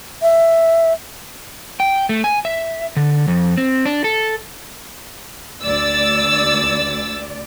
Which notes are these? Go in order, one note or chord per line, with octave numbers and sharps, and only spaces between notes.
E5
G5
A3
G#5
E5
D3
F2
C4
D4
A4
D2 D5 E6 A6